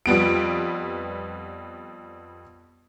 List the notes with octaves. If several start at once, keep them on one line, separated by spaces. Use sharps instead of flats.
F2 G3 B3 D7